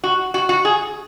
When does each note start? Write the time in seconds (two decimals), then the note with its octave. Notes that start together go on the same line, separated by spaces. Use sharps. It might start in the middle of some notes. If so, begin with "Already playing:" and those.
0.04 F#4
0.34 F#4
0.49 F#4
0.65 G#4